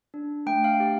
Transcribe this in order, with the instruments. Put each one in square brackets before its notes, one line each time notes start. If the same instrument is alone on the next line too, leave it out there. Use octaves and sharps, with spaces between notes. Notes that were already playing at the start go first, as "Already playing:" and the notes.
[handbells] D4
A3 G5
F5
G4